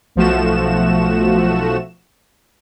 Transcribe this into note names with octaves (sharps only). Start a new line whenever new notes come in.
B1 F3 A3 F#4 E7